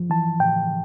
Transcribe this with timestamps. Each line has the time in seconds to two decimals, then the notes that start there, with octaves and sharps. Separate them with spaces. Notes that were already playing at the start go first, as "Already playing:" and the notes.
Already playing: F3
0.10 E3 A5
0.40 A2 G5